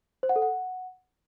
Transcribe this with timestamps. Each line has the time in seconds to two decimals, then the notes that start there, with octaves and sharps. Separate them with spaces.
0.23 C5
0.29 F#5
0.36 A4
0.42 F#5